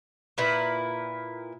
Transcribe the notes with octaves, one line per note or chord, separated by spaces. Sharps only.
A#2 E4 B4